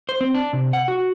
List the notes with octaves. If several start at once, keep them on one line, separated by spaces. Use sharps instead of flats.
C5
C4
D4
C3
F#5
F#4